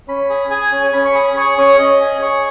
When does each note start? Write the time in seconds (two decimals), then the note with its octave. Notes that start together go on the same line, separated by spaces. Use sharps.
0.08 C#4 B5
0.30 G#4
0.50 G#4 G#5
0.72 C#4
0.83 G#5
0.93 C#4 B5
1.05 C#6
1.15 G#4 B5
1.37 G#4 C#5
1.58 C#4 C#5
1.79 C#4 D#5
2.00 G#4
2.22 G#4 C#5